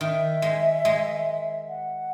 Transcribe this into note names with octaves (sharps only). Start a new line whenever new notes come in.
D#3 E5
G#3
G#3
F#5